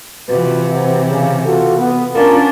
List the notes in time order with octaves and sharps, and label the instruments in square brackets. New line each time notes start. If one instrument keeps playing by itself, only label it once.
[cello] C3 E3 [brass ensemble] F4 F#4 B4
[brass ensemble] C4 F#4
C#3
F4 F#4 A4
B3
[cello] C#4 D4 [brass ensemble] F4 A#4